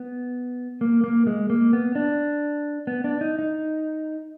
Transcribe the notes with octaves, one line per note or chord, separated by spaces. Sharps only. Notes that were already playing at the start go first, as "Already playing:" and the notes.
Already playing: B3
A#3
A#3
G#3
A#3
B3
D4
B3
D4
D#4
D#4